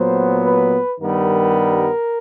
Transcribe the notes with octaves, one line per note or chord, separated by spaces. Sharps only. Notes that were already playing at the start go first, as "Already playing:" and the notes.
Already playing: A#2 F#3 B3 C5
B4
G2 D#3 G3 B3 A#4